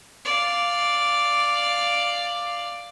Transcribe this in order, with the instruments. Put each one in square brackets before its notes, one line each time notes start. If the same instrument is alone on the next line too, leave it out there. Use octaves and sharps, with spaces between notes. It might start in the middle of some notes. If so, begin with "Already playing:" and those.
[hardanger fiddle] D5 F5